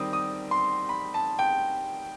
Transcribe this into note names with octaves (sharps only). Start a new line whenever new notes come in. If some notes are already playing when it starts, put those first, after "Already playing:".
Already playing: D#3 G3 C4 D#6
D#6
C6
B5
A5
G5